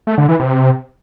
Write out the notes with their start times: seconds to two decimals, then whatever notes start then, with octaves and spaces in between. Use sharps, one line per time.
0.07 A3
0.18 D3
0.29 E3
0.39 C3